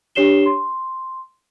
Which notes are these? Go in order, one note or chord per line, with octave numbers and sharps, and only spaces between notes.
D4 G4 C#5 C7 E7 G7
C6